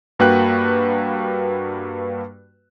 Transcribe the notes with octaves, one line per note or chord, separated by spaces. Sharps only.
G2 A#3 F#4 B4 G5 F#6